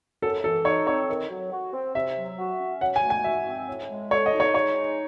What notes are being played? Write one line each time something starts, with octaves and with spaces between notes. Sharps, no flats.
F#2 A4
E3 A4
D#4 C#5
C4 C#5
D#3
F#3
F#4
C4
C3 E5
F#3
F#4
C#4
F#3 F#5
G#5
A3
G#5
F#4 E5
C4
A2
G#3
A4 C#5
D#5
D#4
C#5
G#3 C#5
D#4